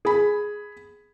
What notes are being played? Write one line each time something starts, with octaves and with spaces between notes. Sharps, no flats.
G#4 B5